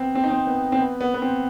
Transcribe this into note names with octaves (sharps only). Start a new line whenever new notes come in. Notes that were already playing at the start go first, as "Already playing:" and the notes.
Already playing: B3 C4
C4
D#4
C4
B3
C4
B3
B3
B3
C4